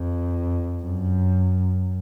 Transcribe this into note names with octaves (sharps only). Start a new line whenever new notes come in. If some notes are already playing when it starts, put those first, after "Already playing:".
Already playing: F2
F#2